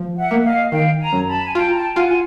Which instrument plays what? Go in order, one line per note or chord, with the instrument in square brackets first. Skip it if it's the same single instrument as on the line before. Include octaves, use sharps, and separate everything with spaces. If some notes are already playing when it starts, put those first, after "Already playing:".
Already playing: [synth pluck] F3
[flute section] E5 F#5
[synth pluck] A#3
[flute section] E5
D#5 F5
[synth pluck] D#3 [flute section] F5 G5
[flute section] G#5 A#5
[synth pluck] F#2
[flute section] A5 B5
G#5
[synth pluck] F4 [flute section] G5 A5
[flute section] A#5
G5 A5
[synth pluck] F4 [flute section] F#5 G#5
[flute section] G#5